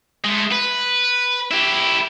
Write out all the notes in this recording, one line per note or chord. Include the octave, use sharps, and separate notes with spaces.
G#3 A3
B4
E4 G4